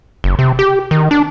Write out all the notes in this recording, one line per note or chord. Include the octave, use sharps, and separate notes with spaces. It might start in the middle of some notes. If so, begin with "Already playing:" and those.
F#1
C3
G4
D#3
D4